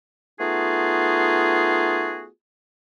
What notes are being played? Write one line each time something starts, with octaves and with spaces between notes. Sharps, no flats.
A3 B3 D#4 F4 F#4 G#4